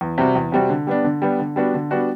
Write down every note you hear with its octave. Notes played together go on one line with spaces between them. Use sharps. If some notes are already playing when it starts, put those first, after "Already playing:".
E2
C3 G3 C4 F#4
E2
C3 G3 C4 F#4
D3
G3 B3 D4
D3
G3 B3 D4
D3
G3 B3 D4 F#4
D3
G3 B3 D4 F#4